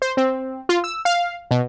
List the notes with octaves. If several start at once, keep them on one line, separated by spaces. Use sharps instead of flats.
C5
C4
F4
E6
F5
B2